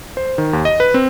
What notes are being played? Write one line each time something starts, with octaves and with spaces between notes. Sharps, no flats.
C5
D#3
D#2
D#5
B4
C4